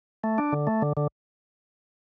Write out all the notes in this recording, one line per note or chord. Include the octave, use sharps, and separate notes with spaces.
A3
D4
D3
A3
D3
D3